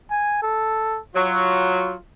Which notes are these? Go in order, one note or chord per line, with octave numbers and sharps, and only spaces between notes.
G#5
A4
F#3 F4